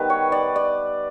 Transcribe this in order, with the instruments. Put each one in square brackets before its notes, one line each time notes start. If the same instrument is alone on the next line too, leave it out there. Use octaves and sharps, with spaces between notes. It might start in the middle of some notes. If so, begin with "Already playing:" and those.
Already playing: [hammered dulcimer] D#3 G3 B3 B4
C#5
D5
D5